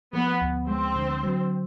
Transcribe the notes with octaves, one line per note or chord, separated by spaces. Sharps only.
F3 B3
D2
G#3 C4
D3
F#3